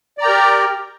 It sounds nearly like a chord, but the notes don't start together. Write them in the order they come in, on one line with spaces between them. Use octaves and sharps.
D5 A#5 G5 A#4 G4